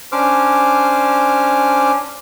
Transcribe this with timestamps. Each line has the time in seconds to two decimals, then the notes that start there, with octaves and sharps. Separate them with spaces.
0.12 C#4 D4 C5 D6 F6